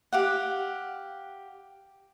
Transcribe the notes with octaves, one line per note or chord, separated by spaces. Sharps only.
G4 F5 F#5